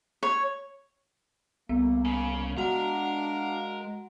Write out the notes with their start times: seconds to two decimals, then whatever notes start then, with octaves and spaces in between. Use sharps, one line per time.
0.23 C#5
1.69 C2 A#3 B3
2.05 C#3
2.57 G#3 D4 F#4 A#4 F5 F#5 A#5